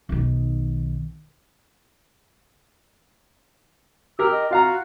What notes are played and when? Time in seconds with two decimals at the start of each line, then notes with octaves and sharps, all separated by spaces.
0.09 B1 D#3
4.19 G4 A#4 E6
4.31 D#5
4.51 F4 F#4 F5 A#5